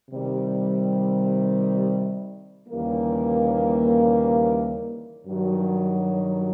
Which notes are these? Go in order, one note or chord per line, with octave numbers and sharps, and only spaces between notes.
C3 D#3 G3
D#2 C#3 E3 G3 A#3
G2 D#3 F#3